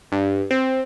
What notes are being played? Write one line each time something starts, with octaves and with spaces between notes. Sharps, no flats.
G2
C4